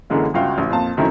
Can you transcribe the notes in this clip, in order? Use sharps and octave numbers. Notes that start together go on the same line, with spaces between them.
F#2 D3 E3 G#3 A#3
G1 C#2 F#4 F5 G5
A1
F2 A#2 F5 A5
F#2 D#3 F#3 A3 C4 E4